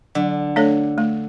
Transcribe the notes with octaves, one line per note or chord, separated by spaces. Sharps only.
D3 F#3
A3 D4 A4 C#5
A3